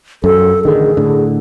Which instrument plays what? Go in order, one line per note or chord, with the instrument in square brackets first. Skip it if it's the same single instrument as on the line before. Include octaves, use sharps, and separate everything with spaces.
[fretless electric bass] F#2 [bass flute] A4
[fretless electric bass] A1 D3 D#3 [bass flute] G#4
[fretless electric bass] A2 D3